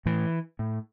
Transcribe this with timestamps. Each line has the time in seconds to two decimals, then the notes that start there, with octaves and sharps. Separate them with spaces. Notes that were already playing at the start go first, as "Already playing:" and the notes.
0.06 A2 E3
0.59 A2